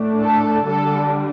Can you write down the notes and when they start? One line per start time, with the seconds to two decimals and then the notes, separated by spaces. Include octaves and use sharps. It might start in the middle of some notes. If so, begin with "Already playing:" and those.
Already playing: A2 A3 D4
0.21 A4
0.66 D3 G3 D4 A4